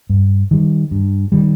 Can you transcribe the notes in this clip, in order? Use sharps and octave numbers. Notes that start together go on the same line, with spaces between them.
G2
D#3 G3
G2
D#3 G3